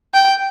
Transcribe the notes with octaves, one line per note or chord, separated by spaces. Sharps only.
G5